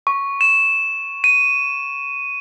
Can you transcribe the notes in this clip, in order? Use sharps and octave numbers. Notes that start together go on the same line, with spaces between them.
C#6
E7
D#7